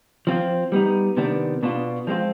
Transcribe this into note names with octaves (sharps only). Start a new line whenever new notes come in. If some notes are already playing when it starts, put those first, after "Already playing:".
F3 C4 F4
G3 B3 D#4
C3 D#3 B3 D4
B2 B3 D4 F4
F3 G#3 C4 F4